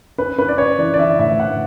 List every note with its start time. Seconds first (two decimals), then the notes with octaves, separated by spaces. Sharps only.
0.18 C#4 B4
0.38 C#4 B4
0.48 D5
0.58 C#4 C#5
0.79 E3 D5
0.94 D5
0.99 C#4 E5
1.19 A2 E5
1.39 A2 F#5